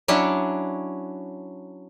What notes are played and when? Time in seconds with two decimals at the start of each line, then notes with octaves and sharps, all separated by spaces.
0.08 F#3 C#4 D4 E4